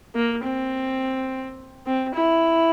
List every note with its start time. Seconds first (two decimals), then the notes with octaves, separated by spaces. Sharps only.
0.15 A#3
0.44 C4
1.86 C4
2.15 E4